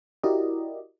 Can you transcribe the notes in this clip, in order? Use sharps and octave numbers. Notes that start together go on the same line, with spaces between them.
E4 F#4 G4 A#4 D5 D#5